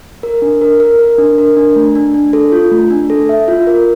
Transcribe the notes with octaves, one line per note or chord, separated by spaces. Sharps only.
A#4
D4
A#4
A#4
A#4
D4
A#4
D4
A3
D4
D4
A4
F4
A3
D4
A4
E5
F4
A#4